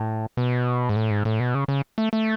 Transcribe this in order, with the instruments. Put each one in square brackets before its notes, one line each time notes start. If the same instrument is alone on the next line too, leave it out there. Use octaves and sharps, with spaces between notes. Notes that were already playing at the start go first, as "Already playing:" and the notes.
Already playing: [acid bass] A2
B2
G#2
A2
G#2
A2
B2
C#3
C#3
A3
A3